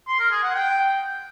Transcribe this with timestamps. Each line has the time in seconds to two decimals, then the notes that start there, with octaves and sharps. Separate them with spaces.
0.08 C6
0.19 A#4
0.31 G#4
0.43 F#5
0.55 G5